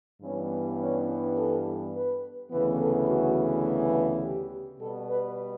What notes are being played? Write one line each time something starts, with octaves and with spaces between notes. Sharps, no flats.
G2 E3 G3 B3 C#4
C#4
A4
B4
D2 C#3 E3 B3 B4
A4
F#4
G4
B2 G3 B3 A4
B4